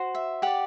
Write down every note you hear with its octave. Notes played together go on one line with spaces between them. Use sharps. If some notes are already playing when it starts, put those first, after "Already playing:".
Already playing: F#4 C5
E5
G4 D5 F#5